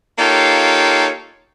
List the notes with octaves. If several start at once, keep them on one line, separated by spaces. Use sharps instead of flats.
A#3 D#4 F4 G4 A4 C#5